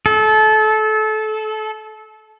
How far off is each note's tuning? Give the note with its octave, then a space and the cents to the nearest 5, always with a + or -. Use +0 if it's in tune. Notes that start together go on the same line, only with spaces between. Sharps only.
A4 -25